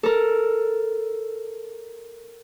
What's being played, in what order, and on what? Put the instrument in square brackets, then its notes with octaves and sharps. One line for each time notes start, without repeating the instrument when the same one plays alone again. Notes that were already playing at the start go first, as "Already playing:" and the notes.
[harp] A4 A#4